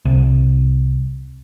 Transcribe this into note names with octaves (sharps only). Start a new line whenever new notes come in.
C2